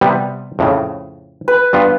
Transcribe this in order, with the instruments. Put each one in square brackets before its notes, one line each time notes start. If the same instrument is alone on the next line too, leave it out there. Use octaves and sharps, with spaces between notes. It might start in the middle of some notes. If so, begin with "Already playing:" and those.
[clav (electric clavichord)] C3 G3 B3
F2 A2 C#3
[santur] B4
[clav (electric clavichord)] G2 B3 F4